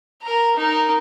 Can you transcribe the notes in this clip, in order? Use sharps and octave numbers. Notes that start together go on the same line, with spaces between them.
A#4 A#5
D#4 A#4